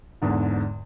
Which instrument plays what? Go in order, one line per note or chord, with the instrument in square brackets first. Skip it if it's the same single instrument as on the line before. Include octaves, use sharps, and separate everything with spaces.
[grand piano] E2 G#2 D3